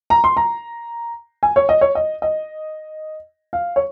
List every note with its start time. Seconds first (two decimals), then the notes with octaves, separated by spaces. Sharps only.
0.10 A#5
0.24 C6
0.37 A#5
1.43 G#5
1.56 C#5
1.69 D#5
1.81 C#5
1.95 D#5
2.22 D#5
3.53 F5
3.76 C#5